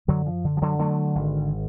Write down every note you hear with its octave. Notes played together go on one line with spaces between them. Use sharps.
F#2 D3 F#3
F3
D3
F3
D3 F#3
D3 F#3 A3
G#1